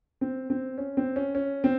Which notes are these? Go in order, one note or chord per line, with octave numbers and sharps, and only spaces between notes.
C4
C4
C#4
C4
C#4
C#4
C4